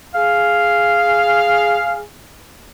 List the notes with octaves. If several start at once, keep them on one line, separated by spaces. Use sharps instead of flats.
G#4 F5